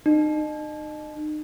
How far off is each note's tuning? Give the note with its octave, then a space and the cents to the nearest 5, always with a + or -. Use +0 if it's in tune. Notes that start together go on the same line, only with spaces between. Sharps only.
D#4 -35